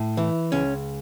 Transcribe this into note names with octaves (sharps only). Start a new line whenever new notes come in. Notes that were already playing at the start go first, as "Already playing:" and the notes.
Already playing: A2
E3
C#2 C#4